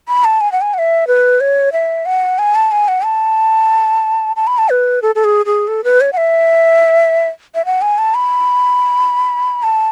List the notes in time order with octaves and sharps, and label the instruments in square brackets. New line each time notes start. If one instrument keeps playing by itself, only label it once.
[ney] B5
A5
G#5
F#5
G#5
F#5
E5
B4
C#5
E5
F#5
G#5
A5
G#5
F#5
A5
A5
B5
A5
B4
A4
A4
G#4
G#4
A4
B4
C#5
F#5
E5
E5
F#5
G#5
A5
B5
A5